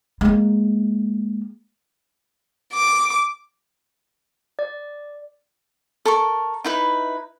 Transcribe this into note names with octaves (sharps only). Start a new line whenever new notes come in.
G#3 A#3
D6
D5
A4 A#4 C#6
D#4 E4 B4